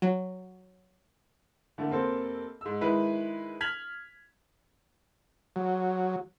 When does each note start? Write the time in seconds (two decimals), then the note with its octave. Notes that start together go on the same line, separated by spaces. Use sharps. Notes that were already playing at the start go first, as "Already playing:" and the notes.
0.02 F#3
1.78 D3 A3 A#3
1.90 F1 A#3 C4 A4
2.61 G#2 E6
2.81 D#3 G#3 E4 B4
3.61 F6 G#6 B6 F7 F#7
5.56 F#3